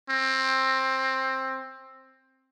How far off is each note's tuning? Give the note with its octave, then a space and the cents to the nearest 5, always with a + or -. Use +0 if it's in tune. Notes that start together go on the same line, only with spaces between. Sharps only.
C4 +15